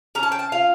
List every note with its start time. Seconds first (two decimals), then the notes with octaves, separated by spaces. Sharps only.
0.15 C#4 A#5
0.23 A5
0.32 G5
0.39 A5
0.52 F4 F5